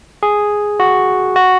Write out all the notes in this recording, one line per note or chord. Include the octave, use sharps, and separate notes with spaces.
G#4
F#4
F#4